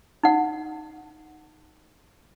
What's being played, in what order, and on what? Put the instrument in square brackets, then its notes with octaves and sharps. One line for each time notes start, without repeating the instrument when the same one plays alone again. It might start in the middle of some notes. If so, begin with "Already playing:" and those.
[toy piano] D#4 F#5